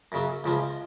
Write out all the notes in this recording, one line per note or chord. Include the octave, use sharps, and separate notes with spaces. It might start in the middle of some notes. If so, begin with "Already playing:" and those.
F#2 C#3 F#3
C#2 C#3 F3 G#3